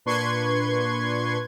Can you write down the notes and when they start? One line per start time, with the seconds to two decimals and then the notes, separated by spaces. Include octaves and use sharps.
0.05 A#2 D4 B4 C6 C#6 G#6